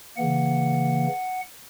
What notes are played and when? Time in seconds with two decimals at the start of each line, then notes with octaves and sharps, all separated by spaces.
0.17 C#3 E3 A#3 F#5